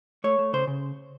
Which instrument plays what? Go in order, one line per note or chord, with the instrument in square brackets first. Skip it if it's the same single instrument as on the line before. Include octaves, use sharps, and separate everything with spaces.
[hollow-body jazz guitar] A3 C#5
A3
C#3 C5
C#3